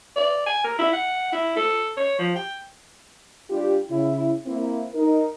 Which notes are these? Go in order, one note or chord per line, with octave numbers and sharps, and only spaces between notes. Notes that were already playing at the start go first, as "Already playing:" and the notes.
D5
G#5
A#4
E4
F#5
E4
A4
C#5
F3
G5
G3 D4 F4 G4
C#3 E4
A#3 C4 E4
D#4 A#4